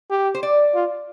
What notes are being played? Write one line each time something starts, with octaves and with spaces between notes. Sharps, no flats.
G4
C5
D5
F4